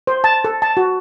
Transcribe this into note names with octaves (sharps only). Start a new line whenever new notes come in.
C5
A5
A4
A5
F#4